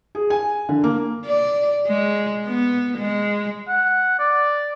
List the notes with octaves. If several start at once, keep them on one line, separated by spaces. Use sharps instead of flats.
G#4
G#5
D3
A#3
D5
G#3
B3
G#3
F#5
D5